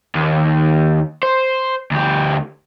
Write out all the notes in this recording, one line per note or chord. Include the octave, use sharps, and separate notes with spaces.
D#2
C5
D2 G4